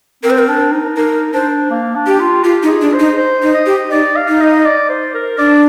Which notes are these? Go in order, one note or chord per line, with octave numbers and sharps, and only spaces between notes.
C4 A#4
C5
A#4
D4
D#4
D#4 A#4
D4 C5
A#3
D4
G4
F4
F4 G4
D#4
G#4
D4
C5
D#4
C5
D#4
D#5
G4
D#4 D5
F5
D#4
D#5
D5
C5
A#4
D4 D5